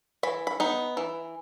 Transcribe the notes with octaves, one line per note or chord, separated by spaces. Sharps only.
E3 B5
B5
B3 D#4
E3